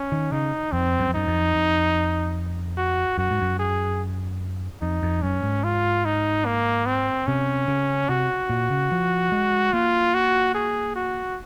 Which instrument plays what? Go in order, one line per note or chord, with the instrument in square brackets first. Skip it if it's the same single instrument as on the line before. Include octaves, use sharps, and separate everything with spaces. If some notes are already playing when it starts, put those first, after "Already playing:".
Already playing: [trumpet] C#4
[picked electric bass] D#3
[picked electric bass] C#3 [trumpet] D#4
[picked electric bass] F2 [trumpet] C4
[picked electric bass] F#2
F2
[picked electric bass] F#2 [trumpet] D#4
[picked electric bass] F2
F2
[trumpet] F#4
[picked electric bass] F#2 [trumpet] F#4
[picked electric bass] G#2
F#2
[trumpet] G#4
[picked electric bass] F2 [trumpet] D#4
[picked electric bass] F2
[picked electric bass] F#2 [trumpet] C#4
[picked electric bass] G#2
[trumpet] F4
D#4
A#3
C4
[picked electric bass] C3 [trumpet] C#4
[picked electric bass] C#3
[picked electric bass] C3 [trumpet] F#4
[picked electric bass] A#2
C#3
F3
G#3
[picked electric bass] A#3 [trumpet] F4
[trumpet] F#4
G#4
F#4